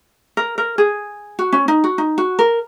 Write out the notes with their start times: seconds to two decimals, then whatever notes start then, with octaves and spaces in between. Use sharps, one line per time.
0.37 A#4
0.58 A#4
0.78 G#4
1.39 F#4
1.53 C#4
1.68 D#4
1.84 F#4
1.98 D#4
2.18 F#4
2.39 A#4